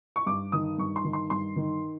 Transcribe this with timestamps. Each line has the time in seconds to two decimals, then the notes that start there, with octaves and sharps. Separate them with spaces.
0.16 C#6
0.26 G2 D6
0.52 D#3 D#6
0.78 G2 C#6
0.96 C6
1.04 D#3
1.13 C6
1.30 G2 C6
1.56 D#3